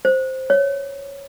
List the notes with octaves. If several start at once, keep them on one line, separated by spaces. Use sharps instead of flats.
C5
C#5